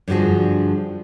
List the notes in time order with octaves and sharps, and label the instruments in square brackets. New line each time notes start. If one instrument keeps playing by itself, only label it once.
[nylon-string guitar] G2 D3 F3 F#4 G#4